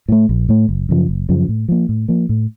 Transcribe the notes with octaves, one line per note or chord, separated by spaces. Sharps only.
A2 A3
A#1
A2 A3
F#1
F#2 C#3 F3
F#1
F#2 C#3 F3
A2
F3 A#3
A2
F3 A#3
A2